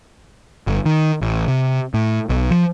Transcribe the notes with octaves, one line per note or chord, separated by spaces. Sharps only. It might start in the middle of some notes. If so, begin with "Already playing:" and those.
G1
D#3
A1
C3
A2
B1
F3